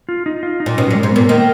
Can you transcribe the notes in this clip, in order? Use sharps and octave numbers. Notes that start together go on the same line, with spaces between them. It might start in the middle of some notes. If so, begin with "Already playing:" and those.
F4
D#4
F4
D#4
A#2
B2 C#4
A#2 F#3
G#3
G#2
A#2 B3
D#3 A#3